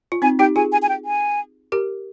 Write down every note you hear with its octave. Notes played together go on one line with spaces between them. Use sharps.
F4
C4 D#4 G#5
D#4 G4 G5
F4 G#4 G#5
G#5
G#5
G5
G#5
G4 A#4